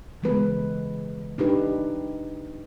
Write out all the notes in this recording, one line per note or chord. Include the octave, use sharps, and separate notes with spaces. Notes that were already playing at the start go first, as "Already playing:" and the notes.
C#3 E3 G#3 B3 B4
D4 D#4 G4 B4